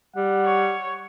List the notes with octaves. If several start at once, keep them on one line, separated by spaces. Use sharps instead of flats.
G3 F#5
C#5